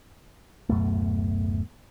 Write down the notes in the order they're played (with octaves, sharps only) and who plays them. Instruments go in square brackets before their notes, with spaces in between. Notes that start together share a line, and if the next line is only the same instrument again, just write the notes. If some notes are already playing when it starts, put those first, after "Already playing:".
[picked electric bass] D1 F#2 B2 A3